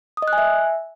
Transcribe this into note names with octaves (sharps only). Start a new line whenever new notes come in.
D#6
D#5
F#6
G#5
E5